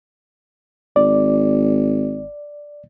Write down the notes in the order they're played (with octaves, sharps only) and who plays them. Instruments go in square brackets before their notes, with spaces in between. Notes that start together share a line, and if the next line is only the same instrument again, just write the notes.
[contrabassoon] G#1 [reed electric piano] D5